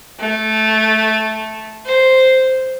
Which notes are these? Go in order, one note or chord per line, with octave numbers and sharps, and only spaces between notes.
A3
C5